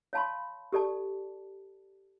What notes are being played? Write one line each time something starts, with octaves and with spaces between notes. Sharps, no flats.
C#5 F5 A5 B5 C6
G4 A4 D5 A5